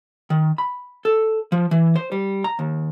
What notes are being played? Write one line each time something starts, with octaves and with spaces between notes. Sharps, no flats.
D#3
B5
A4
F3
E3
C5
G3
A#5
D#2